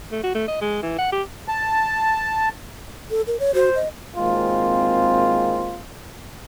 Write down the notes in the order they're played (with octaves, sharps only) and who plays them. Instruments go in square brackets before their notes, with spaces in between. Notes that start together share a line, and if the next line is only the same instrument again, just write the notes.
[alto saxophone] A3
F#4
A3
D#5
G#3
E3
F#5
G4
[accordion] A5
[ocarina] A4
A#4
C#5
[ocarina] F#4 [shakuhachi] C5
[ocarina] D#5
[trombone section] G#1 G#3 A#3 C4 F4